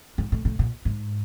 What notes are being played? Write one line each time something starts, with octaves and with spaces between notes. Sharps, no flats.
G#2
A2
A2
A#2
G#2